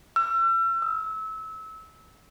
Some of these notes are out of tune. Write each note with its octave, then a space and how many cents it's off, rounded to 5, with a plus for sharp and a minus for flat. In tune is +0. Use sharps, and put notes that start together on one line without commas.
E6 +40
E6 -25